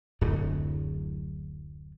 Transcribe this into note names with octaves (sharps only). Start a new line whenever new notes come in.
D1 F#2 A2